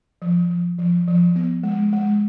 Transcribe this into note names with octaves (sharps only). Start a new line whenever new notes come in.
F3
F3
F3
F3
B3
G#3
G#3